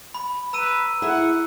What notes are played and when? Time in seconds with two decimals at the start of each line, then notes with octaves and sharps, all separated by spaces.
0.14 B5
0.53 B4 A#5 E6 D#7
1.02 E4 G#4 E5 F#5